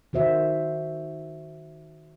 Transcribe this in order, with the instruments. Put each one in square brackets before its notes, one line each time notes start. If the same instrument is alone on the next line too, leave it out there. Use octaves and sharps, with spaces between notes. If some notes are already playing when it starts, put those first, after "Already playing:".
[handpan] D#3 F#4 C5 E5